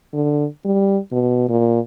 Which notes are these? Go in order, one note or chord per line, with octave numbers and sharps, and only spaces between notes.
D3
G3
B2
A#2